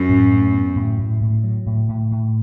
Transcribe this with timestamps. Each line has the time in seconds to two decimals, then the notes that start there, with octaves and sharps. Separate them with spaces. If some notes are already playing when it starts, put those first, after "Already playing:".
Already playing: F#2
0.09 A2
0.31 A2
0.53 B3
0.76 A2
0.99 A2
1.21 A2
1.44 F#3
1.66 A2
1.89 A2
2.11 A2